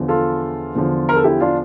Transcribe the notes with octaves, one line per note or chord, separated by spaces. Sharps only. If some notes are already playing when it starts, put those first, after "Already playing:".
Already playing: E2 D3 F3
F4 A4
E2 D3 F3
A#4
A4
E4 G4
D4 F4